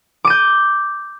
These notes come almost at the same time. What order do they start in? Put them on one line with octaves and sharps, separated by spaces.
D6 D#7 G6